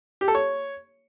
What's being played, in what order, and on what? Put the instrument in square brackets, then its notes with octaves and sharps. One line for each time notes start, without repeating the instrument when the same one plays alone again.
[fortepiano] G4
A4
C#5